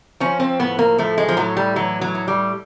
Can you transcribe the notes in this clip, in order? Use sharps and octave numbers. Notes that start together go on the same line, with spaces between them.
F3 C#4
C4
A2 B3
A#3
F3 A3
G#3
F3
A2 F#3
G3
E3 F#3
F#3
A2
G3